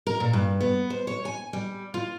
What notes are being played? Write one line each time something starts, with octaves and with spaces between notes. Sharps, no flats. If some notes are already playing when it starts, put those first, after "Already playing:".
A#4
A#2
G2
B3
C5
C#5
G#5
G3
F4